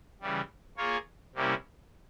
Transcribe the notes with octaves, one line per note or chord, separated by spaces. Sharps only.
C#3 E3 G3
A#3 F4 G#4 C#5
C3 G3 A#3 C#4 E4